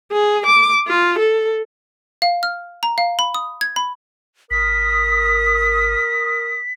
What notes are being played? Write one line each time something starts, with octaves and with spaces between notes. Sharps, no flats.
G#4
D6
F4
A4
F5
F6
A#5
F5
B5
D#6
G#6
B5
G1 A#4 D#6 B6